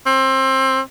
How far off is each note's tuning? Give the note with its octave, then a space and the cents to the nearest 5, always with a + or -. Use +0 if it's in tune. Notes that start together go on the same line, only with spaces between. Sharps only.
C4 +25